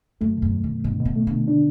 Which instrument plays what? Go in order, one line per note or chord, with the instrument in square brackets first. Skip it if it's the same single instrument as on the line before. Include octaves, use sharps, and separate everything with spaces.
[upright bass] F#2 [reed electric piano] A3
[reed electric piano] B2
[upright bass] F#2
[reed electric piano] B2
[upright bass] F#2
[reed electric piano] B2
[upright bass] G2 [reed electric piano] B2
[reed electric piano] B2
[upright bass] A2
[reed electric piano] A3
[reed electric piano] B2 [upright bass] D3
[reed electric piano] D4